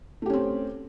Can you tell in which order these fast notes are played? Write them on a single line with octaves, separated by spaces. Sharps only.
A3 G4 C#4 C4